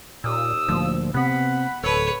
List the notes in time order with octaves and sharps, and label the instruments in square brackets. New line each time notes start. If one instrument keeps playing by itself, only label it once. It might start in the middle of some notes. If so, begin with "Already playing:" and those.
[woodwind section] D#2 D#6 E6 [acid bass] A#2
[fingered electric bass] D2 A#2 [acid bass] F3
[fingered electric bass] C3 C4 [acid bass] B3 [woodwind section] F#5 B5
[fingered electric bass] D1 [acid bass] A4 [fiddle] B4 C#5